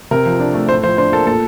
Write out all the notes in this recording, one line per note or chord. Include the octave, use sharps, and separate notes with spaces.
C3 A#4
F3
D4
A3
A2 C5
F3 C5
D4 C5
A#3 A4
A#2 A4